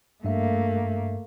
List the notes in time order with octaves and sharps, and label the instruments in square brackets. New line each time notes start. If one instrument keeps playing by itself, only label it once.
[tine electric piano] G2 E5 [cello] A3 A#3